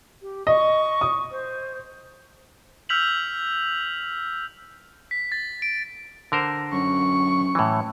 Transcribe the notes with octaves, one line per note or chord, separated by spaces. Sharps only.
G4
D#5 C#6
D#6
C5
E6 F6 G6 B6 F7 F#7
B6
A6
D7
D3 A#4 C5
F#2 C#6
A2 E3